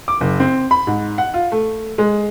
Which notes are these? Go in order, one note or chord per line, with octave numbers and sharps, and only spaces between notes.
D6
F#1
C4
B5
G#2
F#5
F4
A3
G#3